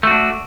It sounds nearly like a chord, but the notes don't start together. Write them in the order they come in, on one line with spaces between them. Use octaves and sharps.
A3 F#4 D4